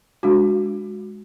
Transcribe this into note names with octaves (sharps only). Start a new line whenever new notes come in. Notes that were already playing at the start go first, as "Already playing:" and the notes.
G#3 D4 F#4